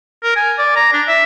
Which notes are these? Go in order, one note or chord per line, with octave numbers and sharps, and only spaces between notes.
A#4
G#5
D5
A#5
D4
E5